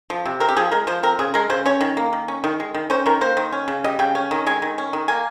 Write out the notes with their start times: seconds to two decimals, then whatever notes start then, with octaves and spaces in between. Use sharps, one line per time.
0.10 F3
0.26 C3
0.40 C4 A#4
0.49 G4
0.57 F3 G#4
0.71 G#3 A#4
0.87 F3 C5
1.03 C4 A#4
1.19 C#3 G#4
1.34 G#3 A#4
1.50 C#3 C5
1.66 C#4 C#5
1.81 D#3
1.97 A#3
2.13 D#3
2.28 C#4
2.44 D#3
2.60 G#3
2.75 D#3
2.90 C#4 C5
3.06 D#3 A#4
3.21 A#3 C5
3.37 D#3
3.52 C#4
3.68 C#3
3.84 G3 D#5
3.99 C#3 G5
4.15 C#4
4.31 D#3
4.46 G#3 G#5
4.62 D#3
4.78 C#4
4.93 D#3
5.08 A#3 G#5